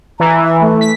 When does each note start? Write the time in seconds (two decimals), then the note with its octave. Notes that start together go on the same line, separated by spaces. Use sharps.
0.20 E3 A#5
0.44 E5
0.61 A3
0.81 B6